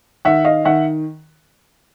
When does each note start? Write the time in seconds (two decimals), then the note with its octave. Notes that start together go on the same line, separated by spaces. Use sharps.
0.25 D#3 E5 F#5
0.45 D#5 F5
0.65 D#3 E5 F#5